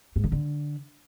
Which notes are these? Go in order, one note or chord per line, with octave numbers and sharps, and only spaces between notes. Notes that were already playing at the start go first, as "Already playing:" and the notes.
G#2
D#3
D3